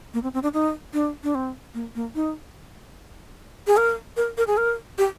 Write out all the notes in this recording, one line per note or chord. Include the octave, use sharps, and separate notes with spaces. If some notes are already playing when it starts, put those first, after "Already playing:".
A#3
C4
C4
D4
D#4
D4
D4
C4
A#3
A#3
D#4
G#4
A#4
A#4
A#4
G#4
A#4
G4